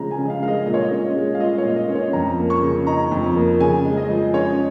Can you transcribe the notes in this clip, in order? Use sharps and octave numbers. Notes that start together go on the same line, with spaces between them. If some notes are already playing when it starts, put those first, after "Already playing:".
Already playing: C#3 F3 G#3 A#5
G#5
C#3
D#5
F5
G#3 F5
D#5
A#2 D#5
C#5
D#5
C#4
G#3
F5
F4 D#5
C#5
A#2
D#5
C#4
C#5
F2 A#5
A#3
C#6
C#3
D#4 A#5
F2
A#3
C#3 G#5
G#3
D#5
F3
C#4 C#5